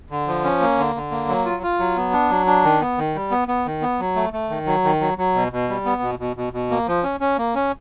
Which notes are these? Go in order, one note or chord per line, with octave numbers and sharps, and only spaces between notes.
D3
F3
C#4
A#3
D3
D3
A#3
F#3
F4
F4
F#3
B3
D4
F#3
D4
D#3
B3
D#3
G3
B3
B3
D#3
B3
F#3
A3
A3
D#3
F#3
D#3
F#3
F#3
B2
B2
G3
B3
B2
B2
B2
B2
A#3
F3
C#4
C#4
A#3
C#4